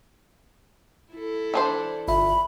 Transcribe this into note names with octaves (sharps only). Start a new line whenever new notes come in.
E4 A4
E3 D4 C5
G1 E5 B5